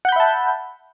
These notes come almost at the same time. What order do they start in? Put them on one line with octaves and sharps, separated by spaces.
F#5 G6 B5 E5 A5